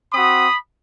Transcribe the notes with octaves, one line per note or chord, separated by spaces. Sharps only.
C4 F#4 B5 D#6